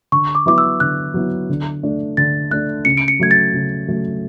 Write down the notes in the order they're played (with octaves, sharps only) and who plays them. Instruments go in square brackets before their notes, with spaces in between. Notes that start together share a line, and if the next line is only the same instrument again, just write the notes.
[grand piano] D3 [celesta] C#6
[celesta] D6
[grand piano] F#3 B3 E4 [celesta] D6
[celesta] E6
[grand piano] D3 [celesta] F#6
[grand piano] F#3 B3 E4
D3
A3 D4
[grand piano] D3 [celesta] A6
[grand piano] A3 D4 [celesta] F#6
[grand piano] C#3 [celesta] C#7
[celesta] D7
C#7
[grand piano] F#3 A3 [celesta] G#6
[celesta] A6
[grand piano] C#3
F#3 A3